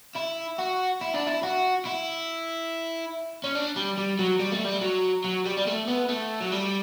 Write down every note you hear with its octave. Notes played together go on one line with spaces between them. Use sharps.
E4
F#4
E4
D4
E4
F#4
E4
C#4
D4
G3
G3
F#3
G3
A3
G3
F#3
F#3
G3
G3
A3
B3
A3
F#3
G3